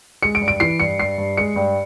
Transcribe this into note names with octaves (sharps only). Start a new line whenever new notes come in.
G#3 C#7
D7
G2
D7
E3 C7
G2 C#7
G2 C7
G2
G#3 C#7
G2